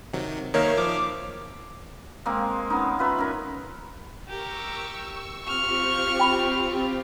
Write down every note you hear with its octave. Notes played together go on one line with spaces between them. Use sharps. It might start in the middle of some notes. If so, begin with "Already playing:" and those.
C3 D#3 F#3
D#3 A#3 D#4 A#4 C#5 E5 F5
F3 D6
G#3 A#3 C4
B3 C#4 D#4
F4 B4 E5
C#4 A#4
G4 A#4 C#6 E6
C4 F4 G4 C#6 F6
G5 B5